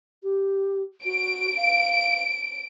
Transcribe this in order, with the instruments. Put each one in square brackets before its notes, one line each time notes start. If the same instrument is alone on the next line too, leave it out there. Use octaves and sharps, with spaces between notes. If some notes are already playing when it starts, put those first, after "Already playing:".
[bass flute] G4
[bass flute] F#4 [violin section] D7
[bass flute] F5